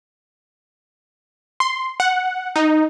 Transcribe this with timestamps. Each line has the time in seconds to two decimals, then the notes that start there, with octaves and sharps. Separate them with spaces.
1.60 C6
2.00 F#5
2.56 D#4